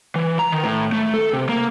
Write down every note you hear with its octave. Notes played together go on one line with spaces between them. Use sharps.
E3
A#5
D#3
A2
A3
A4
C3
A#3